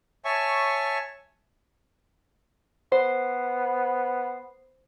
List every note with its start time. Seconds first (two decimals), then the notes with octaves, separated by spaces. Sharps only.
0.25 C#5 E5 G#5 A5 C#6
2.92 B3 C5